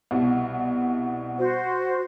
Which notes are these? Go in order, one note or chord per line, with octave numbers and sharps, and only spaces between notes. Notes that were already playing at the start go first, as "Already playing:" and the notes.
C2 B2
F#4 C5